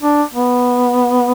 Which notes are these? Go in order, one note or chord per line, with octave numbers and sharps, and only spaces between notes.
D4
B3